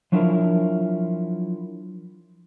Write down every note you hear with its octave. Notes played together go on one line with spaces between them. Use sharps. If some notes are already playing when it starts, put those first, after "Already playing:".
F3 F#3 D4 E4 F4 A#4